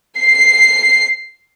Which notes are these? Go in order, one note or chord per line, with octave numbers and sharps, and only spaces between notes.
C7